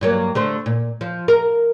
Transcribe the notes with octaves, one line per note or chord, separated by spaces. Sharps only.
G2 F#3 A#3
D3 A3 C5
A#2
F3
A#4